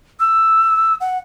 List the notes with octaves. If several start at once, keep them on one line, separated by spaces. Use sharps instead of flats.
E6
F#5